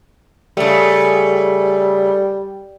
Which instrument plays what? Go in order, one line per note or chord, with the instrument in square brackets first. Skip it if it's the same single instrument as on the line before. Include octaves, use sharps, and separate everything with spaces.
[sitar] C#3 A3 [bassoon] G3